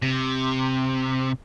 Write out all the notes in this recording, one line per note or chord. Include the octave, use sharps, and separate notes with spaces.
C3